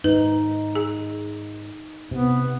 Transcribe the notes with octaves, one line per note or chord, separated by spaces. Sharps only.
G#2 D#4 B4
G#4
C3 B3